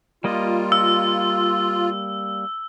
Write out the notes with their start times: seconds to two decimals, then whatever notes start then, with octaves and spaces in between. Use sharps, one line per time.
0.24 G3 A#3 F4 D#5
0.72 E6